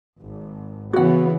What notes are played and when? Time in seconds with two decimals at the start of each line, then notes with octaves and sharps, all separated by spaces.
0.20 G#1
0.93 C#3 E3 B3 F#4 F#5